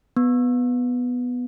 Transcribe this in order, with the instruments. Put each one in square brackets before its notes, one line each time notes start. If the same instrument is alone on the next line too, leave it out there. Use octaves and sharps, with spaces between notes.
[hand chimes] B3